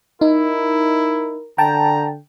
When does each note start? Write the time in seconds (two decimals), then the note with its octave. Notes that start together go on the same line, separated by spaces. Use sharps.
0.21 D#4 E4 A#4
1.58 D3 G5 A5 A#5